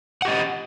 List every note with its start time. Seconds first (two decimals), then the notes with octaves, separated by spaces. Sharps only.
0.22 F#5
0.25 G4
0.28 D#5